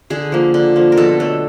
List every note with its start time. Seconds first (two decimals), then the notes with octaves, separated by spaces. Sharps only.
0.10 D3 G#4
0.32 F3 A#3
0.54 D3
0.76 F3 A#3
0.92 A#4
0.97 B2 A4
1.20 F#3 A3 A4